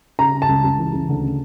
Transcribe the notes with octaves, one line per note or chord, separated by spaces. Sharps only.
C#3 A#5
C#3
A5
C#2
C#2
E3
C#2
D2
C#3